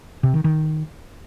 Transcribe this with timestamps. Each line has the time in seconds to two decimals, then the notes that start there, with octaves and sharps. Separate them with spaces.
0.23 C3
0.34 D#3
0.44 D#3